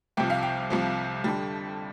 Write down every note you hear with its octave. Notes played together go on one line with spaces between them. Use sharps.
C2 C3 F3 G5
F5
G5
C2 C3 F3
F2 D3 G3